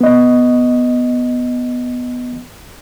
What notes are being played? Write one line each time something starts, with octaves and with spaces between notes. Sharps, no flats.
B3 D#5